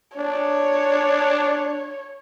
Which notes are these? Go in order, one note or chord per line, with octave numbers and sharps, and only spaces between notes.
D4 C#5